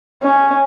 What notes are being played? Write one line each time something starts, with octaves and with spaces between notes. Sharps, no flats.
C#4